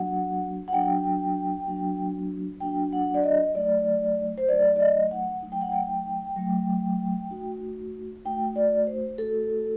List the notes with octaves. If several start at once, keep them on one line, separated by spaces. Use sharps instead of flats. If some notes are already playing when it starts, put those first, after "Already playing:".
Already playing: F#3 A#3 D4 F#4 F#5
F#5
F#3 A#3 D4 F#4 G5
F#3 A#3 D4 F#4
F#3 A#3 D4 F#4 G5
F#5
D5
D#5
F#3 A3 D#4 D5
C5
F#3 A3 D#4 D5
D5
D#5
F#5
F#3 A3 D#4
G5
F#5
G5
F#3 A3 D#4
A3 D#4 F#4
A3 D#4 F#4 G5
D5
C5
A3 D#4 F#4 A4